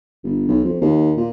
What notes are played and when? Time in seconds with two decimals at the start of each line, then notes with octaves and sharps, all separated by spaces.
0.24 G1
0.48 B1
0.65 F2
0.82 D#2
1.17 A#2